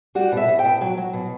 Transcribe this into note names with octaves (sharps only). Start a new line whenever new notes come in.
G3 F#4
B2 E5
B2
G5
B2
F#3
F#3
B2